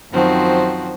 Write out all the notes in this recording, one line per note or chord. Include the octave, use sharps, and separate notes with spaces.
F#2 D#3 F3 C4 F#4